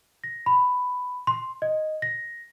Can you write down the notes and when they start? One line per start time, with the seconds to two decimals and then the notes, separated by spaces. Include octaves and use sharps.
0.24 A#6
0.46 B5
1.27 C6
1.62 D#5
2.02 A#6